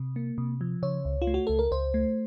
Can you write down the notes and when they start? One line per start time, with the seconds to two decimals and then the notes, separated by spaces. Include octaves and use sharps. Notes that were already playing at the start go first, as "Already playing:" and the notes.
Already playing: C3
0.16 A#3
0.38 C3
0.61 F3
0.82 C#3 C#5
1.05 C#2
1.22 F4
1.27 A3
1.34 F#4
1.47 C#2 A4
1.59 A#4
1.71 C#2 C5
1.94 A3